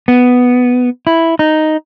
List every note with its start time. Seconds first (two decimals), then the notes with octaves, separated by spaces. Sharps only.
0.08 B3
1.07 E4
1.39 D#4